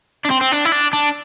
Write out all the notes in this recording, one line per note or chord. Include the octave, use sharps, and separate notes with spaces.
D4
C4
C4
D4
E4
D4
D4